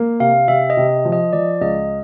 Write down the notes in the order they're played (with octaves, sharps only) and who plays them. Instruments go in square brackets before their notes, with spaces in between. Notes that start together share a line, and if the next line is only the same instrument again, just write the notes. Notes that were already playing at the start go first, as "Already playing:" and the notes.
Already playing: [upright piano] A#3
[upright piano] C3 [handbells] F5
[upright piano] C3 [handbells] E5
[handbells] D#5
[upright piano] C3
F3
[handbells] D#5
[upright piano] F3 [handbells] D5
[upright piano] C#2 [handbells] D#5